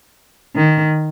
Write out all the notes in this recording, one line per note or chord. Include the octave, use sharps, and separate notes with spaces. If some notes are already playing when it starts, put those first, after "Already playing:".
D#3